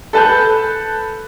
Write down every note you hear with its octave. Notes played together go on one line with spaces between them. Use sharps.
A4 B4 A5 F#6 G6